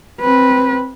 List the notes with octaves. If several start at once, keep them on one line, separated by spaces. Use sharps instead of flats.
C4 B4